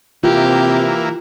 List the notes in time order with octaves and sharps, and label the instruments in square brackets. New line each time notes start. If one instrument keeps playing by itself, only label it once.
[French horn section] C3 [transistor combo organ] E3 A#3 [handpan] F4 [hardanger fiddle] G4